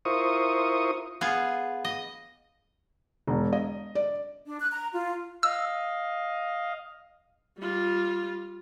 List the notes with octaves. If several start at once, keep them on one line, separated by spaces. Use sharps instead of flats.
E4 F4 A#4 C5 C#6 D#6
B3 F4 G#4
D#5
E1
D#5
D5
D4
F#6
A#5
F4
D#5 F5 E6
G3 F4